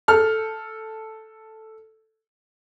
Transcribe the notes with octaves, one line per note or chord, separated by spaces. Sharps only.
A4 F6